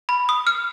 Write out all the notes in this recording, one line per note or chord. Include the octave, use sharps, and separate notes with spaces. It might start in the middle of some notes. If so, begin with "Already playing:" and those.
B5
D#6
F6